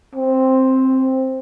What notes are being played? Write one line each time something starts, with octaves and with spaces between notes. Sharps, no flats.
C4